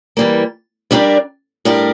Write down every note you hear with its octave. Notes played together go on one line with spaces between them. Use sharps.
E3 G3 A#3
G3 D4 G4 A#4 D5
A2 G3 D4 G4 A#4